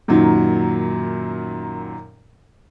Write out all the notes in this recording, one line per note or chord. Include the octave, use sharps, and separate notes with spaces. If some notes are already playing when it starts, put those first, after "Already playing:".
F#2 A#2 D#3 F#3